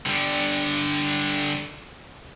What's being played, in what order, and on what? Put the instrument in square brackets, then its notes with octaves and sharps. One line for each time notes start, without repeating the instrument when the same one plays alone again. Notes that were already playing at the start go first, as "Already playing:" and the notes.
[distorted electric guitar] D3 G3